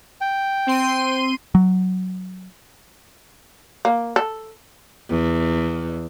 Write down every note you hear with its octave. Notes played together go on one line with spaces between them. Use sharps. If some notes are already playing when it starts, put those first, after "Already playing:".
G5
C4 C6 D#7
F#3
A#3
A4
E2